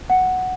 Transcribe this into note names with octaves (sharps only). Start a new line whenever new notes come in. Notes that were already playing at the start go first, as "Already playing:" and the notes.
F#5